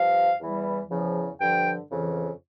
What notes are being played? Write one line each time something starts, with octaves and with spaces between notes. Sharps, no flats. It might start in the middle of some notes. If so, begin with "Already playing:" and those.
Already playing: G2 F3 F5
E2 E3 G3
E2 C#3 F3
G2 D3 F3 G5
F2 C#3 E3